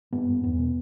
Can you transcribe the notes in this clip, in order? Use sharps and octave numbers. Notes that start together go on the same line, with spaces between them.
G2 B3
G2
E2 B3
B2